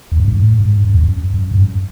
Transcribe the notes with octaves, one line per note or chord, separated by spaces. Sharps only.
E2
F#2
G#2
A2
G#2
F#2
E2
F#2
F#2
G#2
F#2